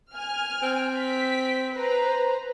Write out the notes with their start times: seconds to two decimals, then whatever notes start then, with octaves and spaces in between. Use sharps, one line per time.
0.15 G#5 F6
0.62 C4
0.99 B6
1.73 B4 C5 A#5